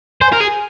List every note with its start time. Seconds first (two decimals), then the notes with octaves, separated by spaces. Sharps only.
0.21 C5 G#5
0.33 A#4
0.41 G#4